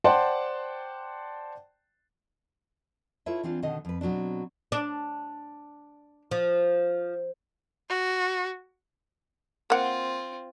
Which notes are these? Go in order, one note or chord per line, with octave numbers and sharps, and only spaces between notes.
C5 D5 F#5 G5 A5 C6
E4 F4 A4 B4 C#5 E5
E3 C4 D4 F4
B2 D3 D#3 D#5
F2 B4
B2 F#3 C4 D4
D4
F3
F#4
A#3 C4 F4 F#5